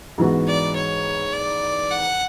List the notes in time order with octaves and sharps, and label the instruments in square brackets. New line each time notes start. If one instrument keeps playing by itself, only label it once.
[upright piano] G#2 E3 B3 F#4
[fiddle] D5
C#5
D5
F#5